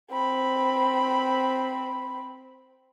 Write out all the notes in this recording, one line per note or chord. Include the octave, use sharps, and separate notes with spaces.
C4 B5